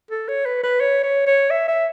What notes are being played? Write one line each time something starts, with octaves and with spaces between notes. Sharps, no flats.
A4
C#5
B4
B4
C#5
C#5
C#5
E5
E5